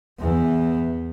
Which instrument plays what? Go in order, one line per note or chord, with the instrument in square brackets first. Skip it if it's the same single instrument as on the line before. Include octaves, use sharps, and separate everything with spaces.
[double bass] E2 E3